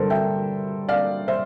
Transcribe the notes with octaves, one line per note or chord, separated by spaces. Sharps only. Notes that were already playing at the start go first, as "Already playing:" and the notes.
Already playing: G2 D3 G3 A4 A#4 C5
E5 G5
D5 F5
C5 E5